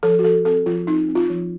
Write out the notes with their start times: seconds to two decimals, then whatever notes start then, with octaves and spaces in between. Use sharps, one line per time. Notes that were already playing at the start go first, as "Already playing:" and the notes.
0.03 F3 A4
0.19 F#4
0.24 F3 A4
0.45 C4 A4
0.66 F3 F4
0.87 C4 D#4
1.08 C4
1.15 F4
1.30 F3